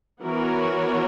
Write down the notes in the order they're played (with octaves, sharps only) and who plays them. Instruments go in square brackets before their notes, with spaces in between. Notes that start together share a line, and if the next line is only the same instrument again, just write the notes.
[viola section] E3 B3 F#4 A#4 C#5